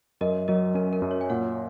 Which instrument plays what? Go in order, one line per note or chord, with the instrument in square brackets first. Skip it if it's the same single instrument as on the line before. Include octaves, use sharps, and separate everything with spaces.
[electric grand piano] F#2 [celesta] A#4 D#5
[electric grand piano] F#3 [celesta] A#4 D#5
[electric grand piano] C#4 [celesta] A#4
[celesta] A#4
[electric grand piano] F#2
[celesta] C#5
G#5
[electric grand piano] A#2 [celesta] C#5 F#5